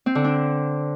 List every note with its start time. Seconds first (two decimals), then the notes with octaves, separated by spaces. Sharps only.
0.06 C4
0.15 D3
0.24 D4